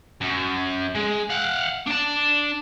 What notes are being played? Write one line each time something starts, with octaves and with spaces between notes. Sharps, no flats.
F#2
G#3
F5 F#5
D4 A5